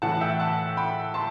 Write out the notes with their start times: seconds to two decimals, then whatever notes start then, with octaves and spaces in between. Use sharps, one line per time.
0.02 A2 E3 F#5 A5
0.21 E5 G5
0.40 F#5 A5
0.77 G5 B5
1.14 A5 C6